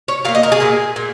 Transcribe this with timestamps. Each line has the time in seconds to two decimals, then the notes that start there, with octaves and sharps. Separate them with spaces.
0.08 C#5
0.25 A#2 F5
0.29 A#3
0.35 D#5
0.43 A#4
0.52 G#4
0.60 A#2 A#3
0.96 A#2